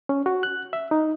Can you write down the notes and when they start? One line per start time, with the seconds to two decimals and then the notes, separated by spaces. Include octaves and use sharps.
0.09 C#4
0.26 F#4
0.43 F#6
0.73 E5
0.91 D#4